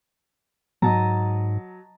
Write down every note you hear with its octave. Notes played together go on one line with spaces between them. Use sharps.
G#2 F#3 D#5 A5 A#5